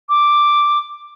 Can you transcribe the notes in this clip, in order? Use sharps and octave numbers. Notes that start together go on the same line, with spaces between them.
D6